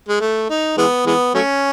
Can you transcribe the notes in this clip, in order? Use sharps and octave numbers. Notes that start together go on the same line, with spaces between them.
G#3
A3
D#4
E3 G#3 B3
E3 G#3 B3
F#3 A3 C#4